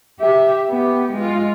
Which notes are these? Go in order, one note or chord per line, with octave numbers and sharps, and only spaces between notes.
G4 E5
B3 G4
G#3 F4